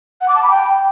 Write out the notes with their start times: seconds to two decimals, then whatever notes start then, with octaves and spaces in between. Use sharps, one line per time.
0.21 F#5
0.28 D6
0.35 A5
0.43 B5
0.50 G5